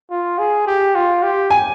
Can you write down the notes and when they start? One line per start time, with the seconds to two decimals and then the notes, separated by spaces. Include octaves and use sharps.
0.10 F4
0.39 G#4
0.67 G4
0.95 F4
1.23 G4
1.50 G#5